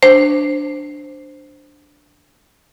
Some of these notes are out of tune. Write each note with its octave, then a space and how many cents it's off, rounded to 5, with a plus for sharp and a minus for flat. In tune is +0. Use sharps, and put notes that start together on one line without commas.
D4 +0 C5 +0